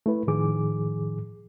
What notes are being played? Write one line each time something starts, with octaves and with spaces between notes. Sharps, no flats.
A3 E4 B4
A2 D#3 F3 G#4 D6